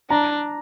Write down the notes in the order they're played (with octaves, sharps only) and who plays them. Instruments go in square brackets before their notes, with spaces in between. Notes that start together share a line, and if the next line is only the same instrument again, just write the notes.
[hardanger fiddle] D4 [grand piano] A#5